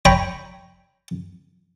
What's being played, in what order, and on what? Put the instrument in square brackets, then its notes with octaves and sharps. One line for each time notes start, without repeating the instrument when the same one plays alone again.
[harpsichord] C#5 G5 A#5 B5